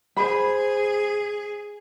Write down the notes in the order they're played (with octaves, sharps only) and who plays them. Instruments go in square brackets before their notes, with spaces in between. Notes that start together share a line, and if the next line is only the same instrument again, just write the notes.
[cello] G#4 [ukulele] C5 B5